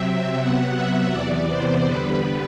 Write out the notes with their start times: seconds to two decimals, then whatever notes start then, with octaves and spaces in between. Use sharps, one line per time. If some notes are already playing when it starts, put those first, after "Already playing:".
Already playing: C3 F#3 C4 E5
0.39 C3 F#3 B3 F#5
0.75 E5
1.12 E2 C3 E3 B3 D5
1.49 C5
1.85 G2 D3 G3 B3 B4